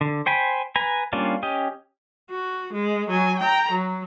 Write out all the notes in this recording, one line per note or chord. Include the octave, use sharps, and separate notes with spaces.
D3
C5 G5 G#5 B5
B4 G#5 A#5
G3 A#3 C#4 D4 F4
C#4 G4 D#5
F#4
G#3
F#3 G#5
G5 A#5
F#3